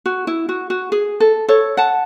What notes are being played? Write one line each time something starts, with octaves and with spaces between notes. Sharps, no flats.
F#4
E4
F#4
F#4
G#4
A4
A4 C#5
F#5 A5